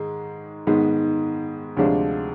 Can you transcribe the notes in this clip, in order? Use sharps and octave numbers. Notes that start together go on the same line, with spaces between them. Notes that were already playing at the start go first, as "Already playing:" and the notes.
Already playing: G#2 D#3 G#3
G#2 D#3 G#3 B3
D2 C3 F3 G#3 D4